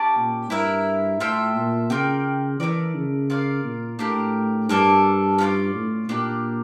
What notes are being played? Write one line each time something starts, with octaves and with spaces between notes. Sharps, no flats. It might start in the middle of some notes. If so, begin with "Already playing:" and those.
Already playing: C#4 G4 D5 A5
A#2
G2 E4 A#4 E5
A2 F4 A4 E5 G5
A#2
C#3 F4 A#4 D5 G5
E3 A3 E4 A#4 D5
C#3
F4 A#4 D5 F5
A#2
A2 D4 G4 A#4
G2 A#3 D4 A4 D5
C#4 F4 A#4 D5
A2
A#2 D4 G4 A#4